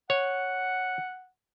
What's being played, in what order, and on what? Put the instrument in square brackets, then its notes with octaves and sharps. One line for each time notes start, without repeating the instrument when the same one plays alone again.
[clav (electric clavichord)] C#5 [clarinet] F#5